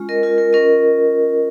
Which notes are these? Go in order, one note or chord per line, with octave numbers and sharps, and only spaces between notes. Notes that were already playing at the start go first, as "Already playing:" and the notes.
Already playing: G#3 C#4 F4
A#4 D#5
F4 A#4
A#4
C#4 A#4 D#5